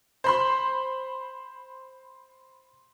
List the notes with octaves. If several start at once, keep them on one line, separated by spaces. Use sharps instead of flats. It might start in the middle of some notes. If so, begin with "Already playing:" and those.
C5 B5 C6